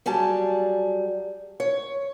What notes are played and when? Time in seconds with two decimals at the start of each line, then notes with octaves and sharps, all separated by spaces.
0.06 F#3 G3 G#4 A5
1.60 C#5